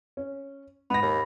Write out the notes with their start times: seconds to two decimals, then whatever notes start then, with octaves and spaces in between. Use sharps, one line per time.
0.17 C#4
0.90 G#2 B3 B5 A#6
1.02 D#2